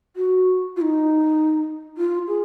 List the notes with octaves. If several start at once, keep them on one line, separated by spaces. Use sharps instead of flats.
F#4
F4
D#4
F4
G#4